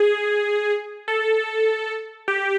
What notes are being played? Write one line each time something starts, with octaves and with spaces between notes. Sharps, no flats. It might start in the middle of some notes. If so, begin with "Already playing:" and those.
Already playing: G#4
A4
G4